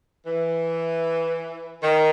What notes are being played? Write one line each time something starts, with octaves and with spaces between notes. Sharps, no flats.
E3
D#3